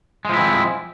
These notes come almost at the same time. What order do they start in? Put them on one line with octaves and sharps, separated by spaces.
G#3 F3 E4 C4